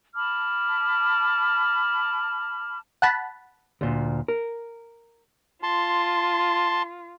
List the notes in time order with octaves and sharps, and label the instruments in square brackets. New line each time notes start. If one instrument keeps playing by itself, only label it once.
[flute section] A5 B5 D6 F6
[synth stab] F#5 A5 B5
[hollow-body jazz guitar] D2 A#2
A#4
[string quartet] F4 [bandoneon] A5 C6